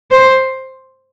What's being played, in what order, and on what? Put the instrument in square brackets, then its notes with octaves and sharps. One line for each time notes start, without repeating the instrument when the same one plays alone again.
[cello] C5